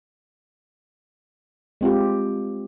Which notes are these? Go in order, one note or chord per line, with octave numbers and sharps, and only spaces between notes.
G#3 C4 F4 G4